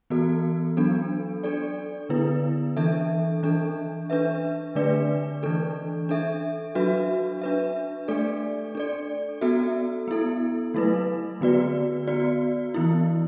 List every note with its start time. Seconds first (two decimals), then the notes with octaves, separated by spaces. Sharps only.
0.10 E3 B3 F#4 A4
0.77 F#3 B3 D4 A4
1.44 D4 A4 D5
2.09 D3 B3 E4 B4
2.77 E3 D4 A4 E5
3.43 E3 D4 A4
4.10 D4 B4 E5
4.75 D3 A3 D4 B4 D5
5.43 E3 D4 A4
6.09 D4 A4 E5
6.75 F#3 D4 F#4 B4 E5
7.42 D4 B4 E5
8.08 A3 D4 A4 D5
8.75 D4 A4 D5
9.41 B3 F#4 A4 E5
10.08 B3 E4 A4
10.74 F#3 A3 E4 B4
11.41 D3 B3 F#4 B4 D5
12.07 B3 F#4 D5
12.74 E3 B3 E4